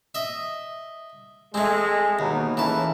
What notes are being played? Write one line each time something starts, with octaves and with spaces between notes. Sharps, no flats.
D#5 E5
G#3 A3 C4
D#2 B2 D#4
A2 C#3 E3 A#3 A5